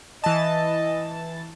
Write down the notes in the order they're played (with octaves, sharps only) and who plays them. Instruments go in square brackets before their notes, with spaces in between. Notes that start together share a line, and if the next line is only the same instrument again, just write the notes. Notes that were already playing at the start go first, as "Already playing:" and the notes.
[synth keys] E3 A5 [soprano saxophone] D#5